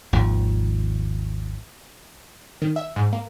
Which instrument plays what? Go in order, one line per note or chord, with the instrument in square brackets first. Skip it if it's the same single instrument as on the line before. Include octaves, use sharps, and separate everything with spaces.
[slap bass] G#1 D#2 F3
[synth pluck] D#3
E5
G#2
A#3